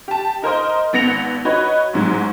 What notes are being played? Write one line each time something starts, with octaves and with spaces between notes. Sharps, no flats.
G4 A5
D#4 A#4 C5 D#5
G#1 B3 A#6 C#7 F7
D#4 F#4 B4 C#5
A1 G#2 F#3